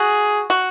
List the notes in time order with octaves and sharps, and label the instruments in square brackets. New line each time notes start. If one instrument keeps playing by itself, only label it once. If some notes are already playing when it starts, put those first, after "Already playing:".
Already playing: [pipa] F#4 [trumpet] G#4
[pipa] F#4